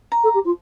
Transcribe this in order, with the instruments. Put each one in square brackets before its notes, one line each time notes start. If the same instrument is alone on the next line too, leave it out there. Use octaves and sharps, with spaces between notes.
[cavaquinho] A#5
[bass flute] A4
G4
F4